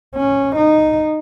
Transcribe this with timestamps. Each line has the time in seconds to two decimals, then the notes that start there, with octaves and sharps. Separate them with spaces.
0.16 C#4
0.56 D#4